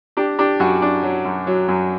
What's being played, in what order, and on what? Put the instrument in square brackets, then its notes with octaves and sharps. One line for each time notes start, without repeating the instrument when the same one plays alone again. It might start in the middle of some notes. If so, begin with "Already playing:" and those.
[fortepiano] D4 G4
D4 G4
F#2 F#4
D4
F#3
F#2
F#3
F#2